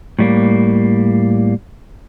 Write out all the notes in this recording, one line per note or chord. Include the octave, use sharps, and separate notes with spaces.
A2 G3 A#3